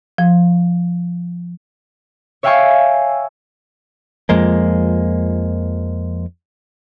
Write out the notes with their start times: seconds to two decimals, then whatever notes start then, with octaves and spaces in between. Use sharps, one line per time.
0.18 F3
2.43 C#5 E5 F5 G5 G#5 C#6
4.29 F2 F3 G#3 A#3